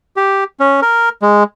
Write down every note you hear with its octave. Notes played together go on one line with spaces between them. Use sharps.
G4
C#4
A#4
G#3